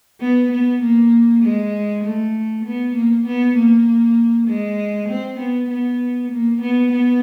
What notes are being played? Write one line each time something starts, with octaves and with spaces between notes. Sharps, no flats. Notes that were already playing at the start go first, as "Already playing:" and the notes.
B3
B3
A#3
G#3
A3
B3
A#3
B3
A#3
G#3
C4
B3
B3
A#3
B3
B3